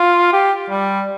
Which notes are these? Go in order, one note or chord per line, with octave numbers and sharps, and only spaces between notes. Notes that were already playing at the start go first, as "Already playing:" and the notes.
Already playing: F4
G4
G3